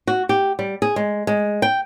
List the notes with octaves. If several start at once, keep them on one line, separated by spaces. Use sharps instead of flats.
F#4
G4
G3
G#4
G#3
G#3
G5